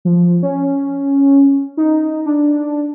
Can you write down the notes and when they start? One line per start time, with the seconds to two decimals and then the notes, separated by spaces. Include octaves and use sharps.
0.05 F3
0.43 C#4
1.77 D#4
2.26 D4